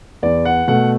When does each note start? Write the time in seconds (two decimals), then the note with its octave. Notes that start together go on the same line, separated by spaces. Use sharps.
0.22 E2 D5
0.45 F#5
0.68 B2 A3 F#5